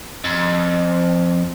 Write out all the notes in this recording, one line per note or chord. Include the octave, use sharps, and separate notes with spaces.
F2